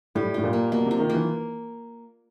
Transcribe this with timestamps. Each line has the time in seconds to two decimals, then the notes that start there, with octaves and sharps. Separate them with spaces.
0.15 A2 G3
0.34 A2 F4
0.44 A#2
0.53 A#3
0.72 B2 A#3
0.86 C3
0.91 F4
1.00 D#3
1.09 E3 A#3